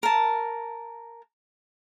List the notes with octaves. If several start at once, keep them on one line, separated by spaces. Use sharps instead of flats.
A#4 A5